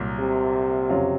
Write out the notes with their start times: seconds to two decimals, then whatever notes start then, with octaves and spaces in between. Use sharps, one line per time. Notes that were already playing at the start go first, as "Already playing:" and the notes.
Already playing: C2 A#2 F#3
0.20 C3
0.89 F2 C#3 F#3 C#4 F4